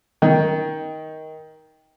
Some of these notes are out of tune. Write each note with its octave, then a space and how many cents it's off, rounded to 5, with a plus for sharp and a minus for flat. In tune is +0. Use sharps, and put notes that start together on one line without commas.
D#3 +10 G5 +0